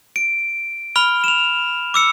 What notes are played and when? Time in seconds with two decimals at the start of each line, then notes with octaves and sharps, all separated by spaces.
0.16 D7
0.96 B5 F6 G7
1.24 E7 F7
1.94 D6 E6 C#7